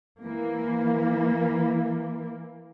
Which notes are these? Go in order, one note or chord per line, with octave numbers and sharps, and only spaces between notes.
E3 A#3